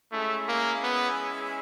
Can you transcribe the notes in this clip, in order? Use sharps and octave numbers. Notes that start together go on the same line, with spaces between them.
G#3 A3 C#4 E4 G#4
A#3
B3